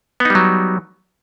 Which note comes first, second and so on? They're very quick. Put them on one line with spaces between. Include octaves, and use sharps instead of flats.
B3 D#4 G3 F#3